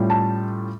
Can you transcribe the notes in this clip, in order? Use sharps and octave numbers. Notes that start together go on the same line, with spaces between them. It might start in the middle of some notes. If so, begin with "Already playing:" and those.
Already playing: A2 G3 C#4 F4
A5